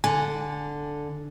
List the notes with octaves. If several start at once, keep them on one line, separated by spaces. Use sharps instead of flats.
D3 G#5